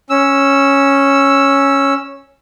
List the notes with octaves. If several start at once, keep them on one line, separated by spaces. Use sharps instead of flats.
C#4 E6